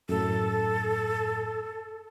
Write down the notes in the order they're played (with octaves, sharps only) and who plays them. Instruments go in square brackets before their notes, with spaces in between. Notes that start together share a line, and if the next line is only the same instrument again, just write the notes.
[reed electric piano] F#2 A2 [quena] A4